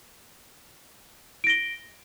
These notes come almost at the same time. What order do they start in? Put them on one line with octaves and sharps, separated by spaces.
D7 A#6 G7